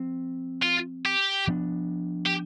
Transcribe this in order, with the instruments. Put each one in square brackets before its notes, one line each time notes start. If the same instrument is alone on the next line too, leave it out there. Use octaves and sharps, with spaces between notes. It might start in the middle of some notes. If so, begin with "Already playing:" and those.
Already playing: [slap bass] F3 C4
[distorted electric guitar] F4
G4
[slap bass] F3 B3 D4
[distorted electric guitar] G4